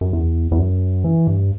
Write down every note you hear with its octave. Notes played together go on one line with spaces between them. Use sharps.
F#2
E2
E2
F#2
E3
G2